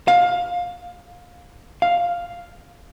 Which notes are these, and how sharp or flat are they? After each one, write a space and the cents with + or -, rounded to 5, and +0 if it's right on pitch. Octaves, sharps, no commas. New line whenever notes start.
F5 +20
F5 +0